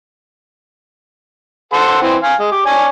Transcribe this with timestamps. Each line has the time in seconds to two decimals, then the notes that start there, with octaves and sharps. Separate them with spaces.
1.73 A4 C5 F#5
2.02 E3 C4
2.23 F5 G#5
2.40 G#3
2.52 G4
2.66 D4 C#5 G#5